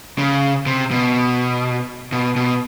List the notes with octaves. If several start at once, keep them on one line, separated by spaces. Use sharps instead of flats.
C#3
C3
B2
B2
B2